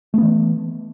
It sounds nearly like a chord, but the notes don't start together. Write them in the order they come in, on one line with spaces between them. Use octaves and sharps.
A3 B3 E3